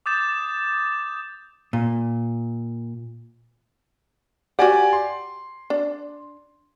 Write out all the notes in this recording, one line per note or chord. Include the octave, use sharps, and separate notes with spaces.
D6 D#6 G6 A6 E7
A#2
F#4 G4 D5 F#5 G#5
C6
D4